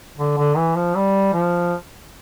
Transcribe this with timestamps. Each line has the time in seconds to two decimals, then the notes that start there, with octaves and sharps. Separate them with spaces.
0.18 D3
0.38 D3
0.57 E3
0.76 F3
0.96 G3
1.34 F3